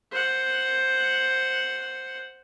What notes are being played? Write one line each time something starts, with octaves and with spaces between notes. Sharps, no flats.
C5 F#5